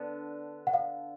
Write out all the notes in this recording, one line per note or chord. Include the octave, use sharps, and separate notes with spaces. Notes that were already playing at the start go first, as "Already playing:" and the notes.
Already playing: D3 B3 D4
F#5
F5